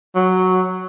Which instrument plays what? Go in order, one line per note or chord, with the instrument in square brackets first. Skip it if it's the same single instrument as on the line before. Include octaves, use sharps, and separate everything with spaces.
[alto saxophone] F#3